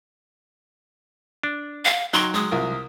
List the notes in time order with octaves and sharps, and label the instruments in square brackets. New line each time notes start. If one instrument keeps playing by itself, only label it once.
[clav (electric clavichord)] D4
[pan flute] F5
[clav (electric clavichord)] F#3 G5 [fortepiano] D#4 [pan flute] C6
[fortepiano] G#3 [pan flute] D#6
[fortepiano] C2 F4 A#4